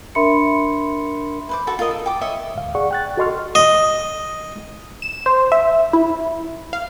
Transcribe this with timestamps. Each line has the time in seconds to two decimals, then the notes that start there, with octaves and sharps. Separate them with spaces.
0.15 D4 A#4 E5 B5 C6 C#7
1.49 B4 C5 D6
1.67 F#4 A4 A5
1.79 F4 A#4 D#5 F5
1.91 A4
2.06 G5 D6
2.21 C#5 D#5 E5
2.55 D2 G#2 F5
2.75 G#4 D5 F#5 C#6
2.91 G5 F#6 A6
3.17 F#4 A4 D#5 C6 C#6 F6
3.55 D#5
5.02 E7
5.26 C5
5.52 E5
5.93 E4
6.73 F5